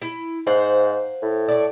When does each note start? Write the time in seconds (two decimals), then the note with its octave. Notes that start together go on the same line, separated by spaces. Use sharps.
0.02 E4
0.47 G#2 C5 F5 F#5
1.22 A2
1.48 A3 D5